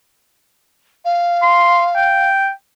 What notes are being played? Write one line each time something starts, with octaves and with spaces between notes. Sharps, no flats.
F5
C6
G5